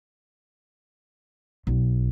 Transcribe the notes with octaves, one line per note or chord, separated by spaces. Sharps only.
B1